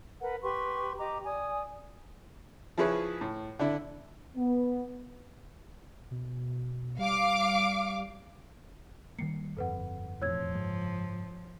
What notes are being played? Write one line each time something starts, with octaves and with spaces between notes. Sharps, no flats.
A#4 B4 F#5
G4 B4 C6 C#6
G4 D#5 A#5 D6
D5 G#5 D#6
F3 E4 G#4 B4 C#5
A2
D3 D4 E4
B3
B2
G3 F5 D6
D#3 G3 A#3 C7 C#7
G1 F2 A4 B4 F#5
E1 F2 A2 F3 C#5 E6 G#6
F#1 G#2 G#3